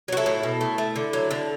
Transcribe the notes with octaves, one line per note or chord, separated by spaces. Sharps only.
F#3 F#4
E4 A4
A2
B2
A3
A3
D3
F#3
D3